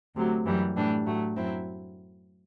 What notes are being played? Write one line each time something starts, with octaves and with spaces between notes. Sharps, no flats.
D2 C3 F#3
F#2 E3 G3
A2 E3 G3 D4
A2 F#3 A3
F#2 F#3 C4 E4